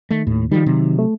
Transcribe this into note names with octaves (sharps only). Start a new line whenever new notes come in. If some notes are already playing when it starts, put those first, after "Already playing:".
D#3 A3
D#2 A2
D#3 F3 G3
C3 F#3
A3